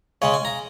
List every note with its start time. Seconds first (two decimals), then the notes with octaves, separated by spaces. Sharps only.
0.22 C#3 G#3 C#4 C#5
0.34 G#5
0.45 A#5